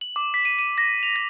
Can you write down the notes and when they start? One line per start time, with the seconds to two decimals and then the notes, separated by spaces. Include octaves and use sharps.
0.01 F#7
0.16 D6
0.34 B6
0.45 D#7
0.59 D#7
0.78 A#6
1.03 F7
1.16 A#6